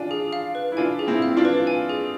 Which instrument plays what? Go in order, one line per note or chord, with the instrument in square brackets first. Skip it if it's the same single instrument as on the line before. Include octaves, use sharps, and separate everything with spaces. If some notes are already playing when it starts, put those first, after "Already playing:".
Already playing: [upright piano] D4 F4 [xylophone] G#5
[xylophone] G#4
F5
B4
[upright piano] E4
[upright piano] D4 F4 [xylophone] G#5
[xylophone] G#4
[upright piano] C4 E4
[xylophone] F5
[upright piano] D4 F4
[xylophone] B4
G#5
G#4